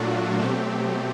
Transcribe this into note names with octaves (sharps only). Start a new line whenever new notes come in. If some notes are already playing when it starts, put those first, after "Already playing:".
Already playing: A#2 F#3 A3 D4 F4 F#4
B2 F#3 A3 C4 G4